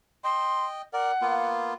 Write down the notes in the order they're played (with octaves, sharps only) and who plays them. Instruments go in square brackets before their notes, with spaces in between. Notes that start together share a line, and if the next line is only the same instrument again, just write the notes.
[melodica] D#5 G5 [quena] C6
[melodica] A#4 D5 [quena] F#5
[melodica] A#3 B3 F4